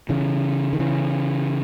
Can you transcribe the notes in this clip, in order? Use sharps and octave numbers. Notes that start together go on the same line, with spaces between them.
C#3 E3
D#3
C#3 E3